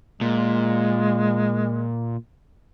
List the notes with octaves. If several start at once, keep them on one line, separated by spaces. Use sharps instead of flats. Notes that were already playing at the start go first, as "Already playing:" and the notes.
A#2 G#3